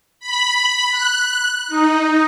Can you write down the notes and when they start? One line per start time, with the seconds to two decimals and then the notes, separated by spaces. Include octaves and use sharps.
0.20 B5
0.90 F#6
1.68 D#4